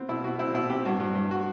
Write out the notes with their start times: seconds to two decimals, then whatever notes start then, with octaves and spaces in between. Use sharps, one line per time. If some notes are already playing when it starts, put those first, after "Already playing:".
Already playing: B3 C4
0.09 B2 E4
0.24 B2 F#4
0.39 C4 E4
0.54 B2 E4
0.70 C4 G4
0.85 G2 F#4
1.00 G2
1.15 G2
1.31 F#4